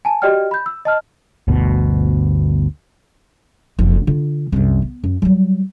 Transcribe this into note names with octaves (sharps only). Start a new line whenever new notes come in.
G#5 A5
F#4 G4 D5 D#5 G5 F6
B5 G6
E6
D#5 A5 F6
G1 D2 B2
F#1 F2
D3 F4
C2 F#2
B3
F#2
F#3 G3